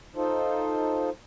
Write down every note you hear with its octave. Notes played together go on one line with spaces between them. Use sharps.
D#4 F4 A4 C5